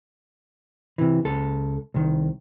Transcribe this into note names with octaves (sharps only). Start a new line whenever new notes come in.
C3 E3
C#2 A4
C2 D#3